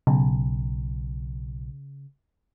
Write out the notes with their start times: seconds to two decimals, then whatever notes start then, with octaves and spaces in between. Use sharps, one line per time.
0.07 B1 C#3